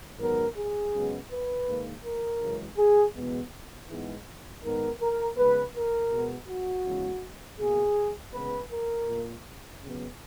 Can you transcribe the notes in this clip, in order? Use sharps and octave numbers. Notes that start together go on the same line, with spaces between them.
G#2 D#3 F#3 B3 A#4
G#4
F#2 C#3 G#3 B3
B4
G#2 D#3 A#3
A#4
F#2 C#3 E3 G#3
G#4
E2 B2 G#3 B3
G#2 E3 G#3 B3
G#2 D#3 G#3 B3 A#4
A#4
C#3 G#3 B3 B4
A#4
B2 G#3 B3
F#4
E2 C#3 G#3
B2 A#3 G#4
C#3 G#3 B3 B4
A#4
A#2 A#3
C#3 F#3 B3